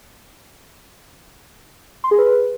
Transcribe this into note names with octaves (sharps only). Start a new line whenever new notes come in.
C6
G#4
B4